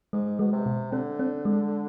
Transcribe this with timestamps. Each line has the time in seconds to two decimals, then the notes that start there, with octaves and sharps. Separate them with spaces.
0.13 G#2 G#3
0.39 B2 G#3
0.53 C3
0.66 B2
0.92 D3 C4
1.19 C4
1.45 G#3